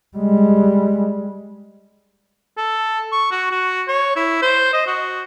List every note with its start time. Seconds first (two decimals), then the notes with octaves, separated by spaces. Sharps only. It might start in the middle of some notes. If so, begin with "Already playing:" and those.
0.17 G3 G#3
2.58 A4
3.12 C#6
3.31 F#4
3.51 F#4
3.88 C#5
4.16 E4
4.42 C5
4.74 D#5
4.87 F#4